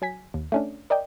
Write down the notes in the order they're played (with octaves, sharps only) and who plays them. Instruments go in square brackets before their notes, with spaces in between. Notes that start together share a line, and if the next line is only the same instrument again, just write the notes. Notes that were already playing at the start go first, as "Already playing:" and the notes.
[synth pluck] F#3 G#5 B6
D#2
A3 C#4 D4
A#4 D5 D#5 G5